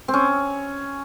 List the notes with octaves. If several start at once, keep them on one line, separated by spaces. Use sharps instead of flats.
C4
C#4